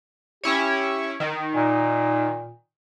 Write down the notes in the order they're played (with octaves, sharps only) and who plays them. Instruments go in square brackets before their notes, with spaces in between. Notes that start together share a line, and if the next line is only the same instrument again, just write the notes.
[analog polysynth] C#4 E4 C#5 [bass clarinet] G4
[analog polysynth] D#3
[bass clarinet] A#2